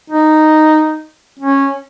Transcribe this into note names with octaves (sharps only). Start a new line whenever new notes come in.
D#4
C#4